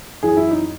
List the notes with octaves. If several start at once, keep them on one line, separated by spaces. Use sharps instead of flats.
F#2 E3 G#4
E4
D#4